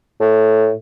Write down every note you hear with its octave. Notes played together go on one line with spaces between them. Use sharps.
A2